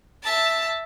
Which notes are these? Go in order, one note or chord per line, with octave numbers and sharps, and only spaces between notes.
E5 A5